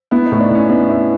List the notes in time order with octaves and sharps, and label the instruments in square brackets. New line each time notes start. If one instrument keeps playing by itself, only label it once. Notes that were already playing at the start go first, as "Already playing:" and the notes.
[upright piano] B3 [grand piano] E4
[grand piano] D#4
[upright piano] A2
[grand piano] D4
[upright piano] A2 [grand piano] C#4
[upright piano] B3 [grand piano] D4
[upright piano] E4